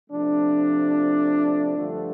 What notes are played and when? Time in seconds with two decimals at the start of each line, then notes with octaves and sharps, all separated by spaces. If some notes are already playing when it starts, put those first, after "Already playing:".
0.10 C3 F3 A3 D4
1.77 G2 D3 F3 A3